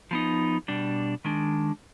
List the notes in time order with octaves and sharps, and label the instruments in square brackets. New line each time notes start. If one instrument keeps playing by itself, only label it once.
[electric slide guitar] F3 B3 D#4
B2 G3 D4
D#3 G#3 D4